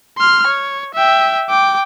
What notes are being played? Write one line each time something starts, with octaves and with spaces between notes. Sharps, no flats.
C6 F6
C#5
E5 G5
G5 D6